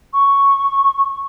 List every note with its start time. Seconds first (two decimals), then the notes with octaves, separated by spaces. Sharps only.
0.13 C#6